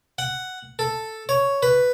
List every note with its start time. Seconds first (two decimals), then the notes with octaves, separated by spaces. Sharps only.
0.18 F#5
0.79 A4
1.29 C#5
1.63 B4